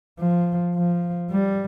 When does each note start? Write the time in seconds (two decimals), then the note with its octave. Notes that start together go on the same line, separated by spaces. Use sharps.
0.19 F3
0.76 F3
1.31 G3